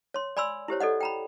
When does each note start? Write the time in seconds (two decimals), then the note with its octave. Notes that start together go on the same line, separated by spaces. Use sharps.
0.14 C#5 C6
0.37 D5 G#5 B5 C6 E6
0.68 E4 G4 C5 C#5
0.80 A4 D5 D#5 F#5
1.01 G5 A#5 B5